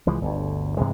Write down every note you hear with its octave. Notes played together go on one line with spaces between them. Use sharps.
C2 E3 F3 G#3
G1 D2
G2 C3 E3 G#3